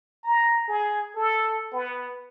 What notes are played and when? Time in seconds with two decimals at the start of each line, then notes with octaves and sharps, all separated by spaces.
0.24 A#5
0.68 G#4
1.16 A4
1.73 B3